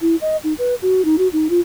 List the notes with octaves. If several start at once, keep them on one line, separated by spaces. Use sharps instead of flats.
E4
D#5
D#4
B4
F#4
D#4
F#4
D#4
F4